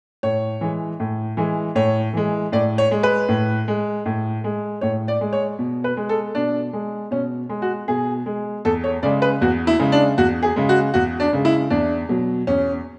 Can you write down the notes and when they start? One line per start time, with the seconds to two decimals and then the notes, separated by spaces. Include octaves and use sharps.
0.23 A2 C#5
0.61 E3 G#3
1.00 A2
1.37 E3 G#3
1.75 A2 C#5
2.14 E3 G#3
2.52 A2 D5
2.78 C#5
2.91 G#3
3.03 B4
3.29 A2
3.68 G#3
4.06 A2
4.44 G#3
4.81 A2 C#5
5.08 D5
5.21 G#3
5.33 C#5
5.59 B2
5.84 B4
5.97 G#3
6.09 A4
6.35 B2 D4
6.73 G#3
7.11 B2 C#4
7.49 G#3
7.62 F#4
7.88 B2 G#4
8.26 G#3
8.65 E2 A4
8.84 C#5
9.03 C#3 G#3 D5
9.22 B4
9.41 E2 F#4
9.67 E4
9.79 C#3 G#3
9.92 D4
10.18 E2 F#4
10.43 G#4
10.56 C#3 G#3
10.69 F#4
10.94 E2 F#4
11.20 D4
11.33 C#3 G#3
11.45 E4
11.70 E2 D4
12.09 B2 F#3
12.47 E2 C#4